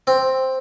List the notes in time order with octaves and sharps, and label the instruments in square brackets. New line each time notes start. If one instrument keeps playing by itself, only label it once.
[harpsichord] C4